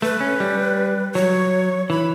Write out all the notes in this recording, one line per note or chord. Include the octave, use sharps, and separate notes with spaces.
A3 B4
C#4
G3
F#3 C#5
E3 B5